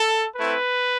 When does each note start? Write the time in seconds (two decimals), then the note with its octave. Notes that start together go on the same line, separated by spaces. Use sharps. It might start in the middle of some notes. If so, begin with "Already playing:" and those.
Already playing: A4
0.37 A3 C4 E4 B4